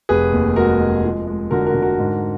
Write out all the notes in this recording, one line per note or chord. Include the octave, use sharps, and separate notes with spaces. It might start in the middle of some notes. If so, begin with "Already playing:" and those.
F1 G#4 B4
D#2
G#3 F#4 A#4
G#3
F3
G#3
D3 F#4 A#4
F#4 A#4
D3
F#4 A#4
G#2